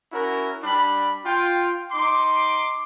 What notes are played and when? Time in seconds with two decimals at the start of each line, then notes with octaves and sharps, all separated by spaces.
0.12 C#4 E4 F#4 A#4
0.63 G3 D4 B5
1.25 F4 G5
1.92 D#4 C6 D6